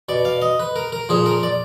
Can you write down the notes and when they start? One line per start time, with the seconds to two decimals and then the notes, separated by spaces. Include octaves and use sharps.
0.09 B2 D5
0.25 F5
0.42 D#5
0.60 B4
0.76 A#4
0.92 A#4
1.09 A#2 F3 G#4
1.26 A#4
1.43 D5